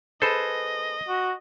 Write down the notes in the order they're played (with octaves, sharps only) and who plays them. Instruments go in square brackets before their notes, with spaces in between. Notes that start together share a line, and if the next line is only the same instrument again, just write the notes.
[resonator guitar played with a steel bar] G#4 B4 [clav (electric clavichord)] A4 C5 [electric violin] D#5
[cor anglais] F#4